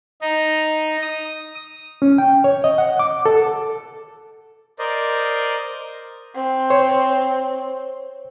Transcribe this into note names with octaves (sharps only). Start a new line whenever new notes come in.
D#4
D#6
C#4
G5
C#5
D#5
F#5
D6
A4
A#4 C5 D5 D#5
C4
C5 C#5